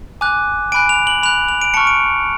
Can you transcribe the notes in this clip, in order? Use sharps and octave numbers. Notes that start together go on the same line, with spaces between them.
G#5 D6 F#6
G#5 B5 F#6 D7
F7
F#7
B5 F#6 F7
F7
D7
A5 C#6 F6 C#7
D7